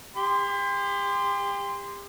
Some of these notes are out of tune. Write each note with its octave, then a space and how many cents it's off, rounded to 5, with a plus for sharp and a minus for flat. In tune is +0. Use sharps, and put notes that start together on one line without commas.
G4 +35 C6 -15